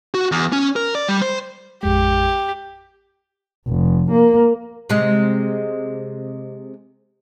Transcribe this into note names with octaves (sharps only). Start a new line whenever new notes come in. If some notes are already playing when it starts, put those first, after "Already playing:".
F#4
E2
C#4
A#4
D5
G3
C5
A1 F2 G#3 G4
F1
A#3
C3 G#3